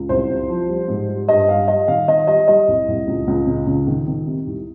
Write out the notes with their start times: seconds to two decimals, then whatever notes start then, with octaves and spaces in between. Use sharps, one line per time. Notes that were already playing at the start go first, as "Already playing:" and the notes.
Already playing: C#2
0.09 C2 C5
0.29 C2
0.49 F3
0.69 G3
0.88 G#2
1.08 G3
1.28 G2 D#5
1.48 G2 F5
1.68 G3 D#5
1.88 D#3 F5
2.08 D#3 D#5
2.27 G3 D#5
2.48 G3 D#5
2.68 C2
2.88 C2
3.07 C#2
3.27 C#2
3.47 C#3
3.67 C#2
3.87 D#3
4.08 D#3
4.27 C3
4.47 C2